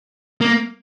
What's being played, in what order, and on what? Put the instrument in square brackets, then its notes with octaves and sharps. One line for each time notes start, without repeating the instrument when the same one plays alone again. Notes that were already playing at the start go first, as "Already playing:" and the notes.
[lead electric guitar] A#3